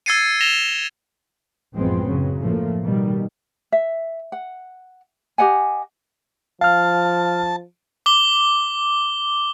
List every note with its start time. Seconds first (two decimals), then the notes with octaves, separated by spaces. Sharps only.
0.06 E6 G#6 A6 C7 C#7 D#7
0.41 A#6 E7 F7 G7
1.73 A1 F#2 F3 G#3 B3 C4
2.04 F#2 C#3 F#3
2.40 A2 F3 A3 A#3
2.81 B2 D#3 G3
3.72 E5
4.32 F#5
5.38 G4 D#5 F#5 G#5
6.61 F3 F5 A5 F6
8.06 D6 G7